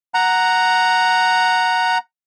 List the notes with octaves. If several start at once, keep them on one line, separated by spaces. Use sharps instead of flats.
F#5 A#5